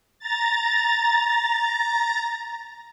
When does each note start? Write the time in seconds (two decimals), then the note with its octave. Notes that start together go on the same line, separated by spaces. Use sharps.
0.19 A#5 A6